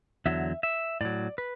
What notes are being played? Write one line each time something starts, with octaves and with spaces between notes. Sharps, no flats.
E2 D3 F#3 E5
E5
A2 F#3 D5
B4